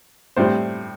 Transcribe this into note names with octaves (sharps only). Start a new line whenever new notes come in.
A2 G3 C4 C5